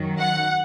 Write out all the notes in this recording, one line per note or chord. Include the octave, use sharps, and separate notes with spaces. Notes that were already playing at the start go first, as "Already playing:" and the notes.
Already playing: F#2 D#3 F#3
F#5